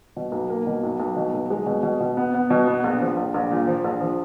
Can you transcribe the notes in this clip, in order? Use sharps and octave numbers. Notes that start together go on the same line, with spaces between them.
B2
B1
A#3
B2
B1
B1
B2
B1
G#3
B2
B2
B2
B3
B3
B2
B3
A#1
F3
A#1
A#1
A#2
F3
A#1
F3